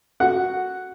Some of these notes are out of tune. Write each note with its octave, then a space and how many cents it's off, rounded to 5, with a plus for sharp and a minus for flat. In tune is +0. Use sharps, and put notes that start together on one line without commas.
F#4 +0 F#5 +0